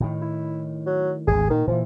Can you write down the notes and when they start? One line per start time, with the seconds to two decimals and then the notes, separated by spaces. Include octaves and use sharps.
0.01 A2 D#3
0.21 E4
0.86 F#3
1.27 G#1 D2 G#4
1.50 A#2 D#3
1.68 A#2 E3 F3